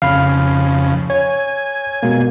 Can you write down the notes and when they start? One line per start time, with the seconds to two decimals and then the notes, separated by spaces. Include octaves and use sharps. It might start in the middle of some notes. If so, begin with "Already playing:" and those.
0.02 F2 C#3 F5 B5
1.10 C#5 G#5
2.03 B2 G#3 A#3